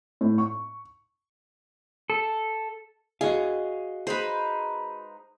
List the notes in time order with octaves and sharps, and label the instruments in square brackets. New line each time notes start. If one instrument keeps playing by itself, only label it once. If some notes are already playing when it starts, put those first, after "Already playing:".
[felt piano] A2
C#6
[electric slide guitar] A4
[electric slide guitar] F#4 D#5 F5 [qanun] G#4
[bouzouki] G#3 D#4 B4 [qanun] C5 B5